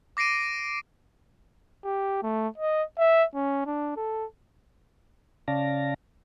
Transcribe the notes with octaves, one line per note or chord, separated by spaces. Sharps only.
D6 A#6 C7 D7 D#7
G4
A3
D#5
E5
C#4
D4
A4
C#3 C#4 D5 F5 A5 A#6